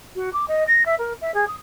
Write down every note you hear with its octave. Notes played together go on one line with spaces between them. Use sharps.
F#4
D6
D#5
A#6
E5
A#4
E5
G#4
D#6